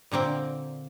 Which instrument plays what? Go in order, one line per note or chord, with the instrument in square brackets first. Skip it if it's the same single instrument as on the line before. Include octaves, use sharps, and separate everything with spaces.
[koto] A#2 D3 A#3 C4